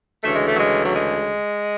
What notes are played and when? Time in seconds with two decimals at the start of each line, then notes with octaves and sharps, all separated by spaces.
0.23 D2 C#3 E3 A3
0.35 G#3
0.46 A3
0.53 F#3
0.59 G#3
0.86 F#3
0.94 G#3